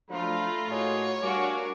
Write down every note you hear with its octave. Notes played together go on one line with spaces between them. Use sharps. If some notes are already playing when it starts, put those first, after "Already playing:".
F3 F#3 A3 D4 F4 F5 A#5 B5
A2 A#3 D#4 F#4 G#4 C#5
G3 D4 F#4 A#4 F5 G#5 D6